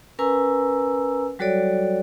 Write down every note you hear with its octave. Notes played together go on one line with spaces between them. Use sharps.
C#4 A#4 B4 G#5 A#5 E6
F#3 G3 F#4 A4 C#5 D5